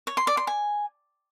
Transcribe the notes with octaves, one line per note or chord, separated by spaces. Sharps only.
C#5
C6
D5
C6
G#5